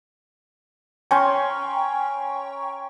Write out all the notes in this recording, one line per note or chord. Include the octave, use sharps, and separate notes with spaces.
C#4 G5 G#5 A#5 C6 C#6